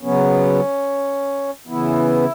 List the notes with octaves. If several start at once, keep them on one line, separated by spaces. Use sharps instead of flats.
C#3 F#3 B3 C#4
C#3 E3 B3 E4